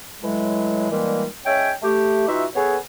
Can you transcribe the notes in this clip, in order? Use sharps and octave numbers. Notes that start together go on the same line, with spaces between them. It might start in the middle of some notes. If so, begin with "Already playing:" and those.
A2 E3 F#3 G#3
A#2 D#3 E3 G3 G#3 A#3
G#3 C#4 C#5 E5 G5
A3 G4
E3 D#4 F4 F#4 E5
B3 G#4 A4 B4 C#5